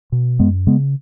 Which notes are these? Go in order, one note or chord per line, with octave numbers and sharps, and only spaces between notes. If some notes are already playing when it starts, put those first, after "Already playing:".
B2
F#2 G#3 B3
C#3 G#3 B3